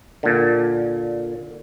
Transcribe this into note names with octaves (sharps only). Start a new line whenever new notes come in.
A#2 D3